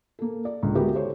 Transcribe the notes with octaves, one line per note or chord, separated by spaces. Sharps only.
A#3 A4
D5
C#2 D3
G#3 B3 E4 F#4 G4 A#4
A4 C5 C#5